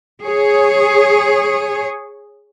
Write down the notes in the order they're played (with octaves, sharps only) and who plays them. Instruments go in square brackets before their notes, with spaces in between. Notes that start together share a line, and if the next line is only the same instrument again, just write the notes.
[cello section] G#4 C#5